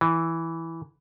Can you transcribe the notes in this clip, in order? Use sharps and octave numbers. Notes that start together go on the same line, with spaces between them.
E3